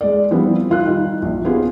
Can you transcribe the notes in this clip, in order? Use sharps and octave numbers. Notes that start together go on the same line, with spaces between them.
G#3 D5
F3 G3 B3 C4 E4
D#3 F4 F#6
G3 D#4
A#1
B3 C4 F4 G4 G#4